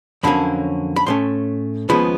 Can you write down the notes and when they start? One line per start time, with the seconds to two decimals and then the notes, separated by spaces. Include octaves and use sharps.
0.23 F2 D3 F#3 A#3 C#4 B5
0.96 B5
1.06 A2 F3 A3 C#4 C6
1.89 D#2 C#3 F3 G#3 B3 B5